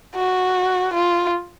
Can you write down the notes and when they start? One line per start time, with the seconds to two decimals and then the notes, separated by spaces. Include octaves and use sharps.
0.16 F#4
0.94 F4